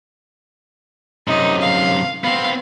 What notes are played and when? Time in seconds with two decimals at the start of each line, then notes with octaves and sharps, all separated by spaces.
1.28 F#2 C3 D#4
1.62 F5
2.24 B3 C4 F5